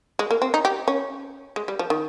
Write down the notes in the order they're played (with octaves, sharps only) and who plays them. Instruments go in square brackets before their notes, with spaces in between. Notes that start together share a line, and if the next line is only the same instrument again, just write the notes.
[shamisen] G#3
A#3
C4
D#4
G4
C#4
G#3
G3
F3
D#3